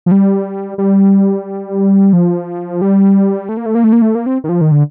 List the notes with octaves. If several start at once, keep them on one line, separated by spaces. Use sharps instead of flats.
F3
G3
G3
F3
G3
A3
A#3
A3
A#3
A3
A#3
A3
A#3
C4
D#3
F3
D#3
D3